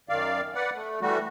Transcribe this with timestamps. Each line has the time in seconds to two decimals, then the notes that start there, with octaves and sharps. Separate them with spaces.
0.09 F#2 D#3 D5 F5
0.55 B4 D5 F#5
0.74 A3
1.01 E3 G3 A3 F#4